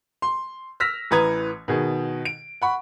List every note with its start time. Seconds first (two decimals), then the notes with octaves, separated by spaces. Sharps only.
0.22 C6
0.80 E6 F6 A#6 B6 F7
1.11 A1 E3 B4 A#5 D#6 G#6
1.68 B2 D#3 G#4
2.25 D7
2.62 F#5 B5 C#6